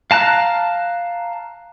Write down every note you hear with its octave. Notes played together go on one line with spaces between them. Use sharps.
F5 A5 A#5 F#6